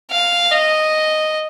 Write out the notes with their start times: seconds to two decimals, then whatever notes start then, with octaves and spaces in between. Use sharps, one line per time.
0.12 F5
0.52 D#5